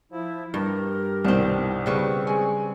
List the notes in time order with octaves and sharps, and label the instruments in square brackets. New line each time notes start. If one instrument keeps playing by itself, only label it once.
[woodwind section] F3 E4
[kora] G2 [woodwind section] G4 A#4
[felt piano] C2 B2 D#3 [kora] C4 D4
[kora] C#3 G3 B4 [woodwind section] C4 C#6
[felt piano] G#3 G#5